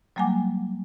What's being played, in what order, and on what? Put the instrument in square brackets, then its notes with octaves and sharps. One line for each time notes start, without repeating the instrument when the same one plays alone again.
[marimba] F#3 G3 A#3 F#5 G#5 D6